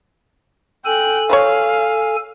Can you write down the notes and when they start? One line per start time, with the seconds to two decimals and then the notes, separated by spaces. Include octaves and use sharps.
0.86 A4 G5 G#5 F#6
1.30 F3 B4 C#5 F5